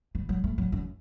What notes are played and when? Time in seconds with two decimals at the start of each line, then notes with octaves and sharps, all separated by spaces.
0.15 E3
0.29 F#3
0.44 A3
0.58 F#3
0.72 F#2